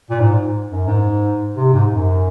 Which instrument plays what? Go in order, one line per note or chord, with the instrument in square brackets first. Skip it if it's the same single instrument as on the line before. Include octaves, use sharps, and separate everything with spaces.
[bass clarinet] A#2
G#2
F#2
G#2
C3
G#2
F#2